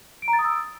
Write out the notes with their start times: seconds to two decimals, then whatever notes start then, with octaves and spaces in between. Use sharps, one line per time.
0.22 D7
0.28 A#5
0.33 A6
0.39 D#6
0.44 E6